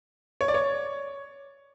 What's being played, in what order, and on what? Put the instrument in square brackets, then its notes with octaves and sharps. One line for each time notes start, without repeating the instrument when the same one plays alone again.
[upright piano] C#5
D5
C#5